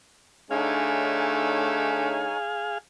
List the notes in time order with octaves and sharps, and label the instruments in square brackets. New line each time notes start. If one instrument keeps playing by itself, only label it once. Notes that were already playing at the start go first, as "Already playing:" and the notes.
[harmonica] D3 A3 [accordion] D#4 C#5 G#5 [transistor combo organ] G#4 F5